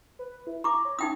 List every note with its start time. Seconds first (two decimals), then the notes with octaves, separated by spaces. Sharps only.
0.19 B4
0.47 E4
0.64 A#5 C#6 D6
0.85 C#5
0.99 C#4 D#4 G5 D#6